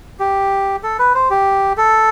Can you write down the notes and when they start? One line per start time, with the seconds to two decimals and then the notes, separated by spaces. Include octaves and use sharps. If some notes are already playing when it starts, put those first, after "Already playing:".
0.20 G4
0.83 A4
0.99 B4
1.14 C5
1.30 G4
1.77 A4